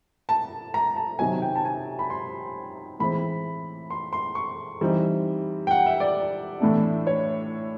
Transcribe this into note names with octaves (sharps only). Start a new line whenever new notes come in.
A5
A#5
A5
C3 D#3 F#3 G#5
G5
A5
G#5
B5
C6
A2 E3 G#3 C4 B5
C6
C6
C#6
E3 G3 C4 D#4
G5
F#5
E5
D5
A2 E3 A3 D4
C#5